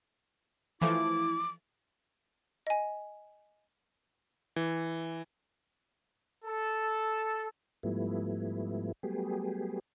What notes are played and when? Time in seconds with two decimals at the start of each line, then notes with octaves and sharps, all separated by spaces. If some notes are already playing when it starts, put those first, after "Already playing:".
0.81 E3 F3 A3 E4 D6
2.67 D#5 G#5
4.56 E3
6.45 A4
7.83 G#2 F3 G3 A3 B3 E4
9.03 F#3 G3 A3 B3 G4 G#4